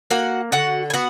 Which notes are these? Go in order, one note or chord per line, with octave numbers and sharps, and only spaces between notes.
A#3 F#4 F#5
D3 F#4 F#5
G#5
B3 F#4 F#5